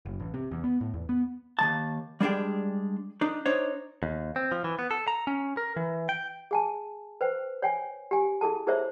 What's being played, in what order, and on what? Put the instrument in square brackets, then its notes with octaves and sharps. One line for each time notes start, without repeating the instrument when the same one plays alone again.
[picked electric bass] F#1
A1
C3
E2
B3
A2
E2
B3
[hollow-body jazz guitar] D#2 D#3 A5
G3 G#3 D4 G#4 G5
D4 D#4
D4 D#4 C5 C#5
[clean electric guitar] D#2
C4
F3
E3
B3
A4
A#5
C#4
A#4
E3
G5
[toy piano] G#4 G#5 A5
B4 C5 G5
C#5 G5 G#5
G4 G#5
E4 G#4 A4 A5
E4 G#4 A#4 C5 C#5 E5